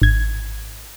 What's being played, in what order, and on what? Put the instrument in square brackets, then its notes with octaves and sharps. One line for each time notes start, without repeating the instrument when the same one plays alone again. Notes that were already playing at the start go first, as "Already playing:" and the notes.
[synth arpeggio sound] G#1 G#6